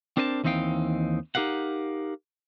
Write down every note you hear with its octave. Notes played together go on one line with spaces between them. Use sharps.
C4 D4 A#4 C5 G#5 A5
D#2 E3 C4 D#4 F5 G5
D#4 G4 A#4 F5 F#5